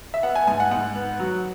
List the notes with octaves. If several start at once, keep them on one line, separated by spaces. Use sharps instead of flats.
E5
B3 F#5
G#5
G#2 G#5
F#5
G#2 F#5
B3
F#3